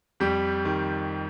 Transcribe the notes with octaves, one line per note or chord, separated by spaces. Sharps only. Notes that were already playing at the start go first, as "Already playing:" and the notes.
F2 G3 G4
D#3